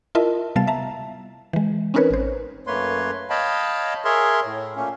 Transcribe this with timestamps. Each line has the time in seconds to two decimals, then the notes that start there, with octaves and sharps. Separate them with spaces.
0.15 E4 F4 A#4 D#5 E5 A5
0.56 C3 G3 B3 F5 A5 A6
0.67 E5 A5 A#5
1.53 E3 G#3
1.94 C4 C#4 D#4 A#4 B4 C#5
2.11 A1 C5
2.67 F#2 A3 A#3 B4 C#5 C6
3.30 C#5 D#5 F5 G5 A5 B5
4.04 G#4 A#4 C#5 E5 C6
4.45 A2
4.76 A#2 A3 A#3 C#4